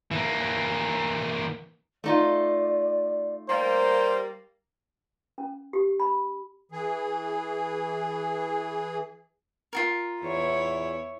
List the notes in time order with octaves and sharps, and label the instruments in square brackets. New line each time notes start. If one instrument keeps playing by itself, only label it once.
[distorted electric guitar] E3 A#3
[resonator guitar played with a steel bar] A3 D#4 F4 [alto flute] D5
[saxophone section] G3 A#3 [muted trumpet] C5 [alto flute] F5
[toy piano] C#4
G4
B5
[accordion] E3 G#4
[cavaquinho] F4 F#4 A#4
[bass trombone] E2 [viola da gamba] E4 C#5